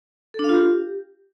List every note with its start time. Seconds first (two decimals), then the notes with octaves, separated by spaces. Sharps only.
0.34 A4
0.39 D4
0.44 F5
0.49 F4
0.54 G4